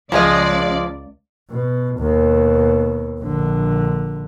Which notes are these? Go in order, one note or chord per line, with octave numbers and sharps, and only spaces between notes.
C#2 F3 G#3 D5 D#5
B2
D#2 B2
A#1 D3